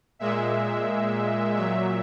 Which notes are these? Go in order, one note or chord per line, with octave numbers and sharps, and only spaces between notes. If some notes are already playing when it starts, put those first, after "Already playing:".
A#2 G#3 E5
A#2 F#3 E5